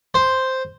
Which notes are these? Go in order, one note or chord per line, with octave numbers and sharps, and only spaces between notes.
C5